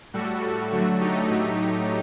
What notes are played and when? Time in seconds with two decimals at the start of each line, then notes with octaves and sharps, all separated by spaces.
0.14 A2 G3 F#4 A4
0.42 F#4 A4
0.72 D3 F#3 A3 F#4 A4
1.01 D#4 G4
1.30 A2 F#3 A3